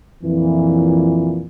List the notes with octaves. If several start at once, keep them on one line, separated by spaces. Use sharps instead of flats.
F2 A#2 E3